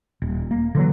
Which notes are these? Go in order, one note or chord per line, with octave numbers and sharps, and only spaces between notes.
D#1
A#3
D3 E3 F#3